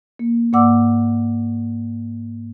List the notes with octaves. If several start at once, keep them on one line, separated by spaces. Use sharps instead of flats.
A#3
G#2 A#3 D5 F#5 D6 E6